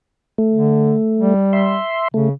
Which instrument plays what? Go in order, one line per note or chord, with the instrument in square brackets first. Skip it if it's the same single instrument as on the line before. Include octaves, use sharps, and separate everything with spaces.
[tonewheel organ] A3
[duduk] D3
G3
[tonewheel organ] E5 C6
[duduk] C#3 [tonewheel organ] A3